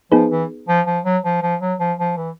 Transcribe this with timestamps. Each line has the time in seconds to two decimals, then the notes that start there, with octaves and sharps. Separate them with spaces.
0.12 F3 B3 D#4 G#4 B4
0.30 E3
0.68 F3
0.86 F3
1.05 F#3
1.24 F3
1.42 F3
1.61 F#3
1.80 F3
1.99 F3
2.17 E3